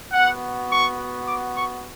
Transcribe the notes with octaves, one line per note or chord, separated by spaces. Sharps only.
B3 F#4 F#5
C#6
D6
C#6